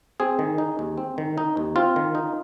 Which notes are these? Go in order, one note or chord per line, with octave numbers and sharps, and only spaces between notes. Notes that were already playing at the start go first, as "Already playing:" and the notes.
C4 G#4
D#3
D#4
D#2
C4
D#3
D#4
D#2
C4 F4
D#3
D#4